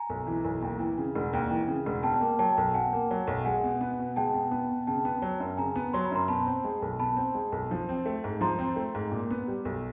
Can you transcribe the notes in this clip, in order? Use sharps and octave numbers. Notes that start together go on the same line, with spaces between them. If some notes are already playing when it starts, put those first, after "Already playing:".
Already playing: G#5 A#5
B1
E3
B1
D#2
E3
C#3
E1
D#2
E3
C#3
E1
B2 G5 A5
A#3
F#3 G5 A5
B1
B2 F#5 G#5
A#3
F#3
B1
G#3 F#5 G#5
B2
B3
B2
G#3 G5 A5
B2
B3
B2
C#3 G5 A5
B3
F#3
F#2
C#3 G#5 A#5
B3
F#3 C6
B5
F#2 A#5 C6
B2 A5 B5
C4
G#3
B1
B2 A5 B5
C4
G#3
B1
F3
C4
A3
G#2
F3 A#5 C6
C4
A3
G#2
A#2
B3
G3
B1